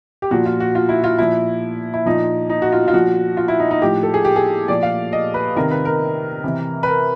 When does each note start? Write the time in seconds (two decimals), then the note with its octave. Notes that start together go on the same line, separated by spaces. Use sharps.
0.22 G4
0.31 A#2 F3 F#4
0.46 F4
0.60 F#4
0.75 F4
0.89 E4
1.04 F4
1.18 A#2 F3 E4
1.94 E4
2.06 A#2 F3 D#4
2.50 D#4
2.62 F#4
2.72 F4
2.88 F4
2.93 A#2 F3 F#4
3.37 F4
3.48 E4
3.60 D#4
3.71 D#4
3.82 A2 F3 G4
4.03 A4
4.14 G#4
4.25 G4
4.36 G#4
4.68 A#2 F3 D5
4.83 F5
5.13 D#5
5.34 B4
5.56 C3 D#3 A#4
5.71 B4
5.85 A#4
6.44 C3 E3
6.83 B4
6.87 A#4